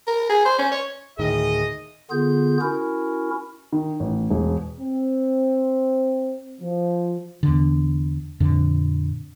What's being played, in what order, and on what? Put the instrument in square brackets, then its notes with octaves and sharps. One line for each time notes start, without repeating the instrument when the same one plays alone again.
[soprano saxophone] A#4
G#4
C5
C#4
C#5
[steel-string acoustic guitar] D2 A2 D#3 [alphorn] G#4 [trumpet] D#5
[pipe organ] D3 B3 F4 G#4 G6
C#4 E4 F#4 A#4
[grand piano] D#3
A1
E1
[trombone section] C4
F3
[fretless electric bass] E2 D3
F2 A#2 D3